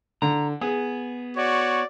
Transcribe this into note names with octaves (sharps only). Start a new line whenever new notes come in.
D3 A#5
B3 G#4
F#4 C#5 D5